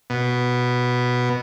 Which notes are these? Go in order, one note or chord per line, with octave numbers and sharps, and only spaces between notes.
B2